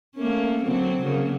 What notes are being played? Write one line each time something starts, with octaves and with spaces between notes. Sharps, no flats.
A3 A#3 C#4
D3 F#3 C4
C#3 F#3 A#3